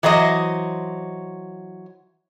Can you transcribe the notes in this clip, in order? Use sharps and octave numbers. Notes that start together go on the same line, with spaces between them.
E3 F#3 C5 D#5